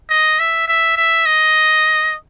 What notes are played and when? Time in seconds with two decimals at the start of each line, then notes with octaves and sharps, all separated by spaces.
0.10 D#5
0.39 E5
0.68 E5
0.97 E5
1.26 D#5